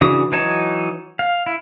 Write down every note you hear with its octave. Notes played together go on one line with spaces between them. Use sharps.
C#3 E3 D4 F#4 D#6
E3 F#3 D#4 C#5 A5
F5
E4